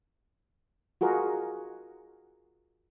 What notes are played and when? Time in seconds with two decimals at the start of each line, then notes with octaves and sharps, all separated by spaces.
1.01 F4 F#4 G#4 A#4